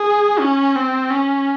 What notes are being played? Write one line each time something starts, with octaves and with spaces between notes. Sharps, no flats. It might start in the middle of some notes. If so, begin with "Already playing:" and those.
Already playing: G#4
C#4
C4
C#4